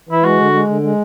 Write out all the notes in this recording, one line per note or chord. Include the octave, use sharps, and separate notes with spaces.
E3 E4
G#3 F#4
D3
G#3
D3
G#3